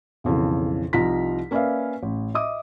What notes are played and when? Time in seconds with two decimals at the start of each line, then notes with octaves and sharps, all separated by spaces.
0.24 B1 F2 C#3 E3
0.93 C2 F3 D#4 F4 A#5 B6
1.51 A#3 C#4 B4 D5 E5 F5
2.03 A1
2.34 D#5 E5 D6 D#6